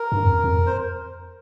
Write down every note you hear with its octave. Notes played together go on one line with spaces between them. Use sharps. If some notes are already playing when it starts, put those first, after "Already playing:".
Already playing: A#4
G2
F2
F2
C5